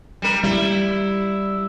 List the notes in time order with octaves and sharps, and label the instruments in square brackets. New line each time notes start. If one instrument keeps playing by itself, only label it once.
[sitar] G3 A#4
[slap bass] G3 [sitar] E4